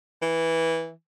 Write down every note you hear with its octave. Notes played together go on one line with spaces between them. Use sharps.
E3